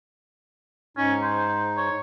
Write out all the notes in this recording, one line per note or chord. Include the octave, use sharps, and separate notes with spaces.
G#2 C#4 D#4
C5
C#5